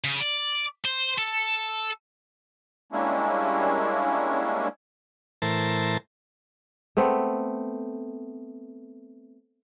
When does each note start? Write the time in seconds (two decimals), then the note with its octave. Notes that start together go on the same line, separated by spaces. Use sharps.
0.04 C#3
0.20 D5
0.85 C5
1.18 A4
2.92 G3 G#3 A#3 C#4 D4 E4
5.42 A2 E3 A#4 C5 A5
6.97 A3 B3 C4